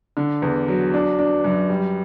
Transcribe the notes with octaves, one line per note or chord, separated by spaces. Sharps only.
D3
E2
F#3
D4
D4
F#2
G3